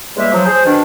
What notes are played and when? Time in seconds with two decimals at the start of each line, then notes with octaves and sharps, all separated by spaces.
0.16 E2 C#3 G3 G#3 A#3 E5
0.32 F3 F#3
0.46 G#4 C5
0.65 B2 D#3 D4